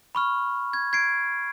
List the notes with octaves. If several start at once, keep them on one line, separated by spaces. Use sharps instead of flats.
B5 C#6 F6
G#6
G#6 C7 D7